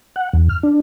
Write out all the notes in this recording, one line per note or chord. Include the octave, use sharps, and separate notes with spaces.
F#5
E2
F6
D4